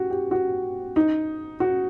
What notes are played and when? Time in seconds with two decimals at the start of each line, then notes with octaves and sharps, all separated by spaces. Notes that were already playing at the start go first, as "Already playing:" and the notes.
Already playing: F#4 G4
0.10 G4
0.31 F#4
0.96 D#4
1.60 F#4